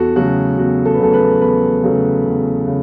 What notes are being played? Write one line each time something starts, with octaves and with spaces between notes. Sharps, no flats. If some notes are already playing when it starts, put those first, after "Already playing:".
Already playing: E2 F#4 A4
C#3 F#3 A3 F#4
E2 F#4
A4
B4
C#3 F#3 A3 A4
B4
E2 B4
C#3 F#3 A3
E2
C#3